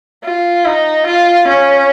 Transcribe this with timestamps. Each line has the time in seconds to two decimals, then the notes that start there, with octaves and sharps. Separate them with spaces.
0.25 F4
0.66 D#4
1.07 F4
1.48 C#4